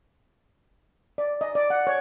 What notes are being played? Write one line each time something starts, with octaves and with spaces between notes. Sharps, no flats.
D5
D#5
D5
F#5
C#5